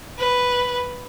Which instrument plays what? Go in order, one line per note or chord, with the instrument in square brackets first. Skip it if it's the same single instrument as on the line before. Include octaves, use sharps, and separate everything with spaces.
[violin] B4